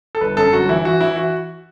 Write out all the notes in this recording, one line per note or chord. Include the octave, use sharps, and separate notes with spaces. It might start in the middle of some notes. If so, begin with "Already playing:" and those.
A4
G1 B4
F#2 A4
G1 F#4
E3 E4
E3 F#4
E3 E4
F#4